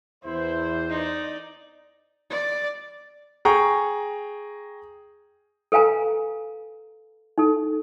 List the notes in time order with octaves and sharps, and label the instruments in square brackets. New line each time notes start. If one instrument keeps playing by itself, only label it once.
[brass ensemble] E2 C5 [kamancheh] E4
[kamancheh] D#4 D5
[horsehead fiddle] D5
[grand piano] G#4 G5 A#5 C#6
[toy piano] A4 B4 F5 G#5 A#5
D#4 A4